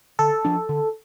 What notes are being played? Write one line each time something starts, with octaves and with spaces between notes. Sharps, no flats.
D3 A4
F3 D4
D3